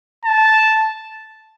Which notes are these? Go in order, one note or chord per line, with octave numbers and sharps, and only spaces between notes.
A5